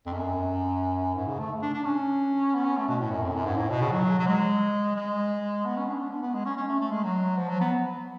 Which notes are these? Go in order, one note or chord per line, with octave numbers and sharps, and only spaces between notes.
F2
F#2
G#2
C#3
A3
D4
D4
C#4
B3
C#4
A3
B2
A2
F#2
F2
F#2
G#2
A2
B2
C#3
F#3
F#3
G#3
G#3
B3
C#4
D4
D4
B3
B3
G#3
C#4
C#4
A3
A3
G#3
F#3
F3
F#3
B3